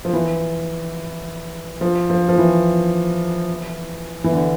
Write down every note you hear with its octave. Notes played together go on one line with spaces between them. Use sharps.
F3
E3
F3
F3
F3
E3
E3
D3